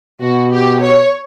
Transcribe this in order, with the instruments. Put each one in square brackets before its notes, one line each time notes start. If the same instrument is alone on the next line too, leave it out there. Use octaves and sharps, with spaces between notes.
[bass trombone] B2 [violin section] F#4
[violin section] G4
C#5